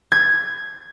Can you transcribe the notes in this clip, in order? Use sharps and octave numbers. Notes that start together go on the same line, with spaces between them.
G#6